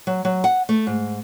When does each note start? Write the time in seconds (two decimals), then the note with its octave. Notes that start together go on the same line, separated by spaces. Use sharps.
0.07 F#3
0.25 F#3
0.44 F#5
0.69 A3
0.87 G#2